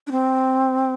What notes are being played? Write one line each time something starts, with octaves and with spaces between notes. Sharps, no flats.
D4
C4